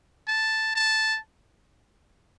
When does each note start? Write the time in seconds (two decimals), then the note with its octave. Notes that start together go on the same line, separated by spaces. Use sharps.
0.28 A5
0.75 A5